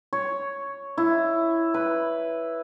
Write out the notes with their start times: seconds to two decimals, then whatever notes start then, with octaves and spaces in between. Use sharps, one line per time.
0.13 C#5
0.98 E4
1.74 B4